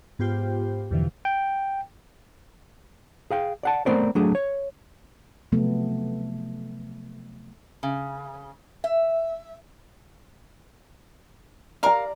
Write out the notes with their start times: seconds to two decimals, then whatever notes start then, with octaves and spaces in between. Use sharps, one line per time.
0.19 G#2 B3 F4 G4 C5 G5
0.91 E2 G2 B2 D3 E3 F3
1.25 G5
3.31 G#4 F5 G5
3.63 D5 F#5 A5
3.86 A3 B3 C4 A#4 C5 D5
4.15 F#3 A3 D4 G#4
4.35 C#5
5.52 C3 F3 F#3 A3 B3
7.83 C#3
8.84 E5
11.83 A#4 D5 F5 A#5